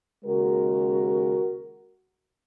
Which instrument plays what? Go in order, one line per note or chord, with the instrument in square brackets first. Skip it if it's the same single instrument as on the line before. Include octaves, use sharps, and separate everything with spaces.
[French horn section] D#2 C#3 G#3 F#4 A#4